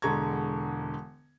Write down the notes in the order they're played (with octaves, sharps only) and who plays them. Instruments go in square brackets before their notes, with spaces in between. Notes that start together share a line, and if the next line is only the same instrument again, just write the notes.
[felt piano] E1 D3 G#3 A#5 C#6 G#6